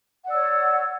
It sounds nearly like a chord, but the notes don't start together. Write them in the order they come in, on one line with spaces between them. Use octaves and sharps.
F#5 D5 E6 C#5